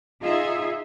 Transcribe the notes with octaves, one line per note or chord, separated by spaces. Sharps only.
D#4 F4 G#4 E5